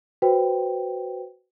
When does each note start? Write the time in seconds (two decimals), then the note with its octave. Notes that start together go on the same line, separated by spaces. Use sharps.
0.22 F#4 B4 C5 G5